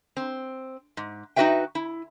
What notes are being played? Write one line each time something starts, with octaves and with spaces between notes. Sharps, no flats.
C4
G#2
D#4 E4 F#4 B4 E5 G5
E4